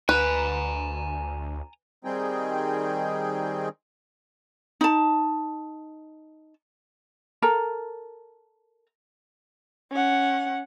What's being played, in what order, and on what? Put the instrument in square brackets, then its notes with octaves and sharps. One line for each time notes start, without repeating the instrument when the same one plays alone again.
[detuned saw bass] D2 [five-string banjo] B4 [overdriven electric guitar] G#5 A#5
[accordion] D#3 G3 C4 D#4 G#4 G5
[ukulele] D#4 A5
A4 A#4 A#5
[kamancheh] C#4 F#5